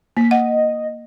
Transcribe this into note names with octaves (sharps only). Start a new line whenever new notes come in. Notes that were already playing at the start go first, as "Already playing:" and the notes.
A#3 B6
D#5 F#5